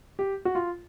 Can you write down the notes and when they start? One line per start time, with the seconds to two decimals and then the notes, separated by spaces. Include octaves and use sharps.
0.19 G4
0.45 F#4
0.55 F4